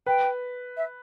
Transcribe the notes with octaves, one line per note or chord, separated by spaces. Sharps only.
B4 G5
E5